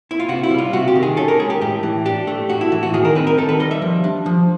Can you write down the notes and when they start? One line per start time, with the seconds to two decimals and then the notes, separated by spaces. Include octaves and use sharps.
0.11 E4
0.20 F4
0.29 C3 F#4
0.43 E4
0.51 G3
0.58 F4
0.73 C3 F#4
0.88 G4
0.95 D#3
1.03 G#4
1.17 C#4 A4
1.28 A#4
1.39 G#3 G#4
1.50 G4
1.61 A2 G4
1.83 E3
2.05 D4 G4
2.27 A3
2.49 A2 F#4
2.61 E4
2.72 E3
2.83 F#4
2.94 D#3 G#4
3.05 A#4
3.15 C4 B4
3.27 A#4
3.37 D#3 A4
3.49 B4
3.60 G3 D#5
3.71 E5
3.82 F3
4.04 D4
4.26 F3